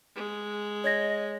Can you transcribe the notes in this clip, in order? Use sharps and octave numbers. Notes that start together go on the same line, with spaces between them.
G#3
C#5 D#5 G#6 A#6